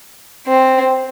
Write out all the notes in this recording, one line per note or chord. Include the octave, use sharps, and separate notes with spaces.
C4